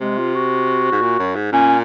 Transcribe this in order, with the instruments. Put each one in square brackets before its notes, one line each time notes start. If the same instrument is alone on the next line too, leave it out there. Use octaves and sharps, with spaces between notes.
[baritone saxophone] C3 [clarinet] G#3
[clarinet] F4
F#4
[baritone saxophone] G#2
A#2
F#2
G#2
[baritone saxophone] A#2 [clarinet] C#4